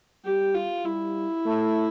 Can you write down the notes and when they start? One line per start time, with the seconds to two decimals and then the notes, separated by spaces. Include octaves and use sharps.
0.25 G3 G4
0.55 F4
0.85 G3 E4
1.46 A3